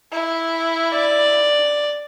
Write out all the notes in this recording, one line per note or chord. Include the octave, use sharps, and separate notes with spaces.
E4
D5